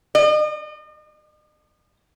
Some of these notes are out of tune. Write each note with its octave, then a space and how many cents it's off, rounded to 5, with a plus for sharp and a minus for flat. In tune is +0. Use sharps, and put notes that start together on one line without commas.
D#5 -40